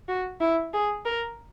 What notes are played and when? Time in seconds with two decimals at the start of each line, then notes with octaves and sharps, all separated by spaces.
0.08 F#4
0.41 E4
0.73 G#4
1.05 A#4